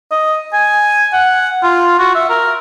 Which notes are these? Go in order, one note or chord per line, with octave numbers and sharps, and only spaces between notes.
D#5
G#5
F#5
F4
F#4
E5
A#4